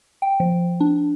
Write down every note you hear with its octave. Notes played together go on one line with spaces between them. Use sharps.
G5
F3
D4